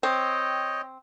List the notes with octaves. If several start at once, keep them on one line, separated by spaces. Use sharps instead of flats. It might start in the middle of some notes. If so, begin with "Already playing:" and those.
C4 C#5 D#5 G5